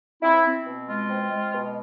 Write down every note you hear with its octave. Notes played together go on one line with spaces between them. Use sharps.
C4 E4
C4
B2
G#3 F4
C4
G#3
B2